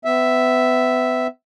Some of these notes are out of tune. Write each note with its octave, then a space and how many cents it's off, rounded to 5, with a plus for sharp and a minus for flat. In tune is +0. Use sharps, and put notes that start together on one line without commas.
B3 +35 E5 +0